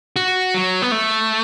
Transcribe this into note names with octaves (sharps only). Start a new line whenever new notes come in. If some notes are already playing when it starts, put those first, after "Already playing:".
F#4
F#3
B3
A3